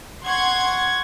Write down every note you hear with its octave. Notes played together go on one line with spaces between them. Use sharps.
F#5 C6 C#6 G#6